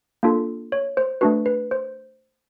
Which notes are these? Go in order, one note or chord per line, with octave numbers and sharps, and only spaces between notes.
A#3 D4 F4 A4
C#5
C5
A3 D4 F#4 B4
B4
C5